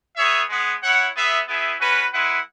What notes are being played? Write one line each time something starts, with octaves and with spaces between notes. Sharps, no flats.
B3 G#4 C#5 E5
G#3 B3 G#4
E4 C#5 F#5
B3 G#4 E5
B3 E4 G#4 E5
C#4 F#4 B4
G#3 E4 B4 F#5